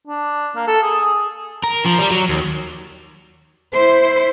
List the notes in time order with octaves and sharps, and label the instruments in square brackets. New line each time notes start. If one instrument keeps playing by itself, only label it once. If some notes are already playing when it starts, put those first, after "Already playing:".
[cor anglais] D4
A#3
A4
G#4
[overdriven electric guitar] A#4
F3
G3
F#3
D#2
[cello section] E4 C5